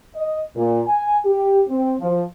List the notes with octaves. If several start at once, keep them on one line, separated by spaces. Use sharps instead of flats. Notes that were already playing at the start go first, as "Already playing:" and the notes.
D#5
A#2
G#5
G4
C4
F3